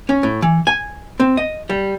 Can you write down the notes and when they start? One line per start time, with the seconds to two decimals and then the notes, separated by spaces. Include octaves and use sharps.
0.09 C#4
0.23 A2
0.42 E3
0.67 G#5
1.20 C4
1.37 D#5
1.70 G3